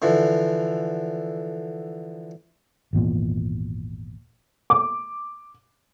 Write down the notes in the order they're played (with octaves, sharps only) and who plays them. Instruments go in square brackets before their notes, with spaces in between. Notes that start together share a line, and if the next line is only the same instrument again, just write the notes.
[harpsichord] D3 E3 F3
[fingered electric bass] G#1 E2 A#2
[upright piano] D6